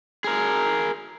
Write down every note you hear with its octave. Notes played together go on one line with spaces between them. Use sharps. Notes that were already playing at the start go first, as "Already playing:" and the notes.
G#4 A#4